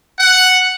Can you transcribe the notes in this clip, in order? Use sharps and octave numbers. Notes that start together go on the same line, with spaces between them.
F#5